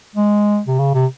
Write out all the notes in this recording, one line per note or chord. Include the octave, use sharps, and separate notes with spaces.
G#3
C3
C#3
C3